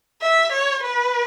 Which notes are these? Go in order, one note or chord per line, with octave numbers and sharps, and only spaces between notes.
E5
C#5
B4